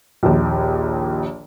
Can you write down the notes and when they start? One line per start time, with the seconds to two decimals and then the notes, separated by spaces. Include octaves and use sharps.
0.23 A#1 D#2